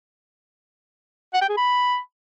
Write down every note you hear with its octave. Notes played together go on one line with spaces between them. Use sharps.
F#5
G5
G#4
B5